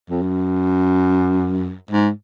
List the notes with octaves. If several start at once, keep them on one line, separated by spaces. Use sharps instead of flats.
F2
F#2
G#2